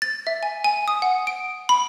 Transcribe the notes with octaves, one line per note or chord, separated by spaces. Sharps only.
A6
E5
G#5
G#5
D#6
F#5
D7
B5